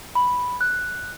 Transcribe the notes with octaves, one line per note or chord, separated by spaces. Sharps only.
B5
F#6